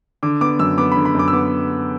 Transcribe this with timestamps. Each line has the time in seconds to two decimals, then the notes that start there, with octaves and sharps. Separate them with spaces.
0.23 D3 D6
0.41 B3 D6
0.59 F#2 E6
0.78 B3 D6
0.92 B5
0.96 D3
1.05 B5
1.15 F#2 D6
1.28 E6
1.33 B3 D6